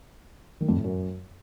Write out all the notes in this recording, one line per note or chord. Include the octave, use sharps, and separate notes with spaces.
D#3
F2
A2
F#2